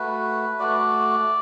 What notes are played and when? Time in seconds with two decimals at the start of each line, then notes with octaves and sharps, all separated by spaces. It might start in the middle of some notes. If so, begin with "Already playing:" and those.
Already playing: A3 F#4 B4
0.59 A3 F#4 D5